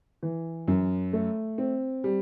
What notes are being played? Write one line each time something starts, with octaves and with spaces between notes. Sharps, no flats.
E3
F#2
A3
C4
G3